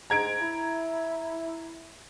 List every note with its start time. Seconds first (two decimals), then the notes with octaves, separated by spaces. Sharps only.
0.10 G#2 A#5 G#6 D7
0.41 E4